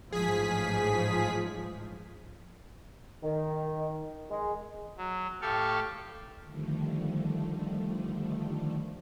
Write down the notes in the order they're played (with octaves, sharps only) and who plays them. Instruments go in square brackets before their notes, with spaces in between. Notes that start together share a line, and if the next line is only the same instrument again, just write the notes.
[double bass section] A1 G#2 F3 [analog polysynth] G#4 B6
[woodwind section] D#3
G#3
[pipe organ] F#3
A2 G4 A4 F5 C#6
[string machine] D3 D#3 F3 G3 A3